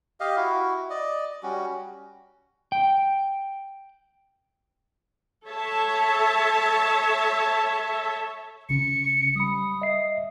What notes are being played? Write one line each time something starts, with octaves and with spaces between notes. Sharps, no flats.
G4 D#5 F5
E4 F#4
D5 D#5
G3 C#4 F#4
G5
A4 C#5 E5 A5
G1 C#3 C#4 C#7
G3 B5 D#6
D#5 E5 C7